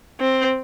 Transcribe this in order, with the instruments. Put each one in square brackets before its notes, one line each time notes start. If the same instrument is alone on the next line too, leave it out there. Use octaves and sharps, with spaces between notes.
[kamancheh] C4